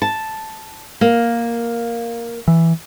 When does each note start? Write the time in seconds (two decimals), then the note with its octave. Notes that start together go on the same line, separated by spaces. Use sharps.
0.02 A5
1.01 A#3
2.48 E3